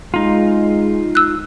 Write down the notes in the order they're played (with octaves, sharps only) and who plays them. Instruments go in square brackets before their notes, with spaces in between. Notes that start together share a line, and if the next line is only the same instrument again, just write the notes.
[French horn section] G#3 [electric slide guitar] D#4 F4
[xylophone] E6 F#6